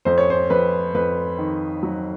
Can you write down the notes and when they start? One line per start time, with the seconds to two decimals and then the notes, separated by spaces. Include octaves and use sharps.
0.05 F2 C5
0.18 C#5
0.30 C5
0.50 F2 B4
0.95 F2 B4
1.39 D#3
1.83 F#3